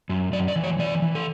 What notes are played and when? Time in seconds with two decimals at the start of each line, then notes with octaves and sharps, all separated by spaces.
0.09 F#2
0.33 F#2 D5
0.48 D5
0.56 E3
0.64 C#5
0.79 E3 D5
1.02 E3
1.15 A4